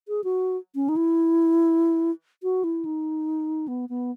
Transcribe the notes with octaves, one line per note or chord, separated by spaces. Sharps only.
G#4
F#4
C#4
D#4
E4
F#4
E4
D#4
B3
B3